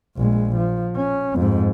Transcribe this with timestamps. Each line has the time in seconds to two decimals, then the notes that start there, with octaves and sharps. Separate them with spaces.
0.17 A#1 G#3
0.56 F3
0.96 C#4
1.35 F2 G#2